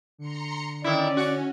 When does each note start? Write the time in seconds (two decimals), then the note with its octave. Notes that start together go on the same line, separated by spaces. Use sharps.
0.18 D3 A#5 C6 C#7
0.84 D#3 C#4 E4 D5
1.17 F#4